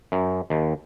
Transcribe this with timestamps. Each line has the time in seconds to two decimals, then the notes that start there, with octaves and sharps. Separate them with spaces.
0.12 F#2
0.50 D#2